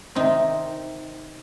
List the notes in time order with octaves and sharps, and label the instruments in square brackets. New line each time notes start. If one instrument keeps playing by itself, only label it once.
[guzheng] C3 D#3 C4 D#4